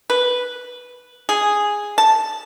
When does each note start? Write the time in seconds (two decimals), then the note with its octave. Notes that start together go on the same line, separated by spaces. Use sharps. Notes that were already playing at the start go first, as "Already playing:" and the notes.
0.10 B4
1.29 G#4
1.98 A5